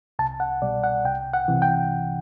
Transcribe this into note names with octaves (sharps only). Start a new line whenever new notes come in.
C2 A5
F#5
B2 G3 D5
F#5
C2 G5
F#5
C3 E3
G5